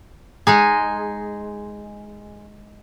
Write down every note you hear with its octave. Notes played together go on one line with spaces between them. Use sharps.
G#3 D#4 G#4